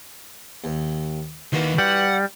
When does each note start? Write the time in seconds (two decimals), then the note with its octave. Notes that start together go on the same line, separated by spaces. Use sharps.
0.64 D#2
1.53 D#3 E3 A#3 F#4
1.78 G3 F#5